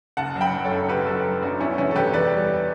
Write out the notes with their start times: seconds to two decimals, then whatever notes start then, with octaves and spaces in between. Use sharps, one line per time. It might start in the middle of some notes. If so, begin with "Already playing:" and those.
0.17 F#1 F#5 A5
0.36 F#3
0.41 G5 B5
0.53 F#3
0.65 A4 C#5
0.71 F#2
0.89 F#1 G4 B4
1.06 F#3 F#4 A4
1.24 F#3
1.42 F#2 D4 F#4
1.60 B2 C#4 E4
1.78 E2 C#4 E4
1.91 A4
1.95 E2 G4 B4
2.13 E2 B4 D5
2.32 G3